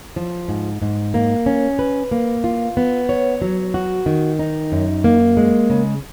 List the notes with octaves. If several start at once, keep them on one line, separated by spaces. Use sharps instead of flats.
F3
G#2
G#2
A#3
C#4
B4
A#3
F4
B3
C#5
F#3
F#4
D#3
D#4
F#2
A#3
G#3
C#3